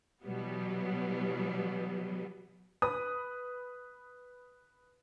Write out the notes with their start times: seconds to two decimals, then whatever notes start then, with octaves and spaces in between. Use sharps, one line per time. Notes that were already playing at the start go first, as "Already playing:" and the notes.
0.23 B2 E3 F#3 G3 B3
2.82 B4 D#6